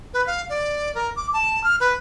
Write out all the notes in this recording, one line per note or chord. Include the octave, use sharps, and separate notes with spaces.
B4
F5
D5
A#4
D6
A5
F6
B4